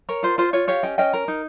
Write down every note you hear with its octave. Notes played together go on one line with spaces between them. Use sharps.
A#4 C#5
F4 C5
F4 C5
F4 C#5
G4 C#5 F5
C#4 D#5 G5
C#4 D#5 G5
A#4
D#4